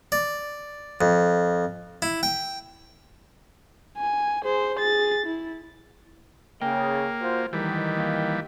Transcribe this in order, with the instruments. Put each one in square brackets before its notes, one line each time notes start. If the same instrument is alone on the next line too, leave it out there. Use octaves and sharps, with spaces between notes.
[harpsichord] D5
F2
E4
G5
[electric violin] G#5
G#4 C5
G#4 A6
E4
[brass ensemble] C#3 [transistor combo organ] A#3 [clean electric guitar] G5
[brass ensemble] F4 F#4 C5
[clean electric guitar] G#2 A3 [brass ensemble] D#3 [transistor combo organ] E3 G3
[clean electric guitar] A#2 F4